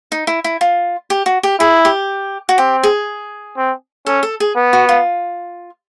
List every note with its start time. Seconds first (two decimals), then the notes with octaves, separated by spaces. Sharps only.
0.12 D#4
0.27 E4
0.44 E4
0.61 F4
1.10 G4
1.26 F#4
1.43 G4
1.60 E4 G#4
1.85 G4
2.49 F#4
2.58 C4 G4
2.83 G#4
3.57 C4
4.06 C#4 A4
4.23 A4
4.40 G#4
4.56 B3
4.73 F#4
4.89 F4